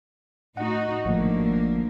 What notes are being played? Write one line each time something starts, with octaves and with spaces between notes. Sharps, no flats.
A2 D#4 F#4 F#5
G#1 D3 F3 A3 A#3